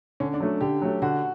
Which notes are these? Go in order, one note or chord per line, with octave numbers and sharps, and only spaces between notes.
D3 C#4
D4
F#3 A3
D3 G4
F#3 A3
D3 F#4